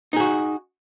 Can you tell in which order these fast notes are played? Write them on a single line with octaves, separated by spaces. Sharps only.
D#4 G#4 F#4